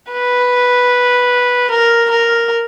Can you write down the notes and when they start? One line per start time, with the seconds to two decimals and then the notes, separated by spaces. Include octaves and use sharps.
0.12 B4
1.71 A#4
2.10 A#4